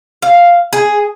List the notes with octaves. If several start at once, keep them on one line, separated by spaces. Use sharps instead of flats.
F5
G#4